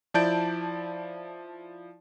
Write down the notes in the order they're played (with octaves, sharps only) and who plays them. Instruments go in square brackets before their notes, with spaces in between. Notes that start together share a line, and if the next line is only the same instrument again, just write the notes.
[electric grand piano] F3 E4 D5 A5 G6 D7